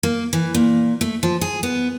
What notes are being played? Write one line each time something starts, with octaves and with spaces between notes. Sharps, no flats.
A#3
E3
A#2
A3
F3
G#4
B3